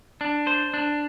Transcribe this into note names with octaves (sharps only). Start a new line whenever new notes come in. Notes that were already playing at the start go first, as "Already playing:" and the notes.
D4
C5
D4